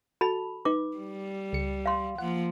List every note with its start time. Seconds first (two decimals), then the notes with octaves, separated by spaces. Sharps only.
0.21 F#4 A4 A5 B5
0.65 D#4 B4 D6
0.97 G3
1.53 C#2 C#7
1.86 F5 C6
2.18 F3 A#3 F#5